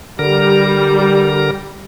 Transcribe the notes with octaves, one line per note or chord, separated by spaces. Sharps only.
D3 G3 A#4 A#5